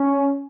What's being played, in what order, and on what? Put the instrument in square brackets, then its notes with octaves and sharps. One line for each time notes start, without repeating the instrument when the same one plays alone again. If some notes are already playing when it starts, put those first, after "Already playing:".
Already playing: [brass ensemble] C#4